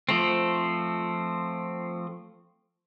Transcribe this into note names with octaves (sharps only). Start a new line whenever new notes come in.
F3 A3 C4